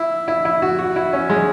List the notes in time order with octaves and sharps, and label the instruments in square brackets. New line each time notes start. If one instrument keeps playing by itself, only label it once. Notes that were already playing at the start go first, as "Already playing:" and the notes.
Already playing: [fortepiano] E4
E4
E4
F#4
F#4
E4
C#4
G#3